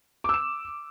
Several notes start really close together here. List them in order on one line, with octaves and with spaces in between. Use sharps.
D6 E6 E7